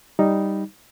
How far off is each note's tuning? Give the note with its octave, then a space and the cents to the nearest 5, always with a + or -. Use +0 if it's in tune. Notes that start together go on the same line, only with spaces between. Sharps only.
G3 +0 D#4 +0